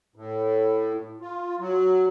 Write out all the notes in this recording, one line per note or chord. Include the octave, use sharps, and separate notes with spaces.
A2
F4
F#3